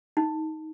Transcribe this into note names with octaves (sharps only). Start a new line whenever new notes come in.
D#4